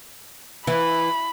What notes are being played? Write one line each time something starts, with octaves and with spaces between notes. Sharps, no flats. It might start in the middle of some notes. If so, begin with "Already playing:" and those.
E3 B5